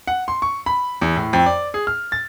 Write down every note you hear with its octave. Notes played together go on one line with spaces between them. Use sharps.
F#5
C6
C#6
B5
E2
A2
F2
D5
G#4
F6
A6